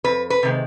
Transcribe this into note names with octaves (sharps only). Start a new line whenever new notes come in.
F2 B4
B4
C3 D#3 G#3